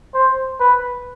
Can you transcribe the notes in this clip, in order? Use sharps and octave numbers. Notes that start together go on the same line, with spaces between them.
C5
B4